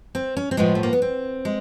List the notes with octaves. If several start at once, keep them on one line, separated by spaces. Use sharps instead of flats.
C4
C#4
C4
A2 F3 G#3 B3
A3
A#3
B3
C4
G#3